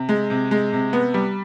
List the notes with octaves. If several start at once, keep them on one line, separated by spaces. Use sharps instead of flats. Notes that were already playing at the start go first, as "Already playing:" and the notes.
Already playing: C3
G#3
C3
G#3
C3
B3
G3